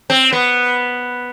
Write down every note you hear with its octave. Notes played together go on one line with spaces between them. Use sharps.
C4
B3